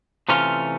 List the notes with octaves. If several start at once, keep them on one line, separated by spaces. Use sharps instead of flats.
C3 E3 A3 C#4 F4